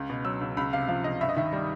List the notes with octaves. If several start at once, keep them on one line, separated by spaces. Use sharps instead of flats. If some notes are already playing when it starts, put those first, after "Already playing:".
Already playing: C#2
B2
F#3 E6
C#2
C#2 B5
C3 F5
F3 F5
C#2 D#5
G2 E5
D#5
D#3 E5
G3